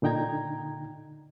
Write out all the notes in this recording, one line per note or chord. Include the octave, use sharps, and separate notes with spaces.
A#2 D3 D#4 G5 A#5 G#6